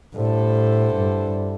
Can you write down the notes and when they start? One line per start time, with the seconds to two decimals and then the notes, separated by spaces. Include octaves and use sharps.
0.13 A2 D3 G3 E4 A4 C5
0.95 G2